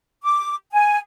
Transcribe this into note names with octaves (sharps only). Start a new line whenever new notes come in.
D6
G#5